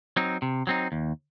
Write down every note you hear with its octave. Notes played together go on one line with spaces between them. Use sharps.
F#3 C4 D#4
C3
F#3 C4 D#4
D#2